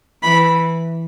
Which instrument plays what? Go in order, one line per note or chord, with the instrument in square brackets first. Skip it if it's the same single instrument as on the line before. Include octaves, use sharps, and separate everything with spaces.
[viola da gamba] E3 [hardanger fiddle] B5